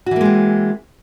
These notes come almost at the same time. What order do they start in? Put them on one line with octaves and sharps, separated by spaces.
F#4 E3 A#3 G#3 C4